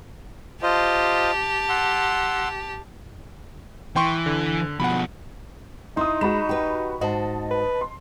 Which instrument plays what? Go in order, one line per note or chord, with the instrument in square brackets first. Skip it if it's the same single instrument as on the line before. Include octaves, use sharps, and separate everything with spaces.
[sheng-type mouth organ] F4 C5 D#5 [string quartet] G4 A5
[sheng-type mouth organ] F#5 C6 E6
[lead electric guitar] E3 [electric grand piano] G5 C6 C#6
[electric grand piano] D3
[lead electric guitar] B2 F3 [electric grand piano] F#5 B5
[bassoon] D#4 [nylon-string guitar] E4 [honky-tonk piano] C6 D#6
[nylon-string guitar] G#3 [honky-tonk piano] F#4 B5 E7
[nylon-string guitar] G4 B4
[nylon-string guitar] G#2 F#4 C5 [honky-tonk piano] D#5 A5
[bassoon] B4
[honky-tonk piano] C6